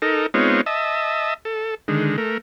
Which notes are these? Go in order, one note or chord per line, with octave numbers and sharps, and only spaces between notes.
D#4 A4 A#4
G#3 B3 C4 D#4 F4 C#5
D#5 E5 A5
A4
D3 D#3 G#3
A3 A#4